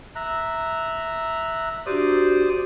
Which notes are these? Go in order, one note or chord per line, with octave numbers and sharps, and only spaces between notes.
E5 A#5 F#6
D4 F#4 G4 C5 D5 D#6